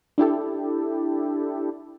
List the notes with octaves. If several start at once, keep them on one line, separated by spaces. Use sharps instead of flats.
D4 E4 G4 A4